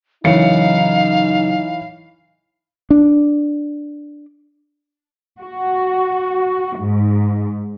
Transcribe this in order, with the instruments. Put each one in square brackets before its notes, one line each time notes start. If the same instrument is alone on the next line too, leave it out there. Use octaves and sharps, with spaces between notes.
[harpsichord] F#2 C#3 [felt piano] E3 C#5 C#7 [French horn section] D#4 [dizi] F5
[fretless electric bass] D4
[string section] F#4
G#2